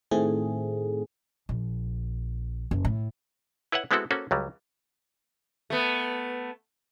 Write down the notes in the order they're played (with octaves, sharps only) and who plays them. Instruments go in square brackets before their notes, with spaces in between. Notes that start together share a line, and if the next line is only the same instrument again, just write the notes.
[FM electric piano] A2 D#3 A3 C4 G#4
[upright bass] A#1
F#1
A2
[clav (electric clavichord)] E4 B4 C#5 E5 F#5
G#3 B3 C4 E4 F#4 A4
A#3 C#4 F#4 A4 C5
C#2 F#3 G3
[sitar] A3 B3